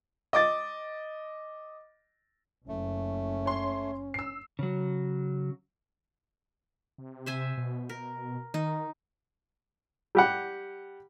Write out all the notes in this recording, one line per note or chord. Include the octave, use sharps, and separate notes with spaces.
D#5 D6 A6
F#1 A3 C#4
C#5 C6
E6 C7
C#3 F#3
C3
C5 E5 G#5
B2
A#4
D#3 D#4
G3 G4 F#5